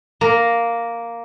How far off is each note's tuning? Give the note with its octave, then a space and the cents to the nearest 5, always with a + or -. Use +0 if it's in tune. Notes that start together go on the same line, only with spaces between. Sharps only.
A#3 +0 A#5 +0